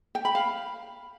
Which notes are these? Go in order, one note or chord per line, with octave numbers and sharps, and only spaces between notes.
G5
B5
F5